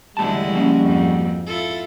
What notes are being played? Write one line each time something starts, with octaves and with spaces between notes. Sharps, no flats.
E2 A2 D3 G3 G#3 E4 F#4 A5
F3 A#3 C#4
F2 G#2
E4 F4 A4